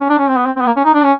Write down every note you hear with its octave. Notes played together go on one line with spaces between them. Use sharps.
C#4
D4
C#4
C4
B3
C4
C4
B3
A#3
C#4
D#4
D4
C#4